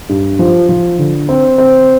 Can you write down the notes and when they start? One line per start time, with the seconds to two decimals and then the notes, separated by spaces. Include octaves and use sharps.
0.09 G2
0.39 F3
0.69 F3
0.99 D3
1.29 C4
1.58 C4